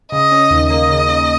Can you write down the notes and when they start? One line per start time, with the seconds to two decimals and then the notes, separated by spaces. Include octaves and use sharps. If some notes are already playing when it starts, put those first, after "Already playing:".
0.12 C#3 D#5
0.32 C#4
0.50 D#2
0.70 A#3 D#5
0.90 C#3
1.09 C#4